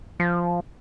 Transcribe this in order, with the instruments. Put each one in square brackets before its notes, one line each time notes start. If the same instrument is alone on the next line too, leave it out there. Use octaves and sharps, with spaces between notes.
[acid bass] F3